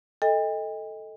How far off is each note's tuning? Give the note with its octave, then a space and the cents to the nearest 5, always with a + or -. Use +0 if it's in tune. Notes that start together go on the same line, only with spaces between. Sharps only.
A4 +0 D#5 +15 G5 +40